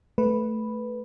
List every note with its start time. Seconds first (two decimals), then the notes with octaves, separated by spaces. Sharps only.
0.18 A3 B4